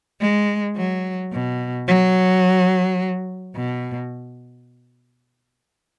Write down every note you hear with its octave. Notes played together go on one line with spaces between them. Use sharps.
G#3
F#3
B2
F#3
B2